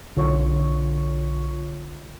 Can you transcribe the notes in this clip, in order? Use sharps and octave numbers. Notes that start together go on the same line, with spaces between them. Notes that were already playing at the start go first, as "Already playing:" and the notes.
B1 D3 F4 C#5 C#6